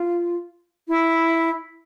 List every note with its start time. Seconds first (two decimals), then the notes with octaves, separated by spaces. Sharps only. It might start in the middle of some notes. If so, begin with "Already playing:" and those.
Already playing: F4
0.88 E4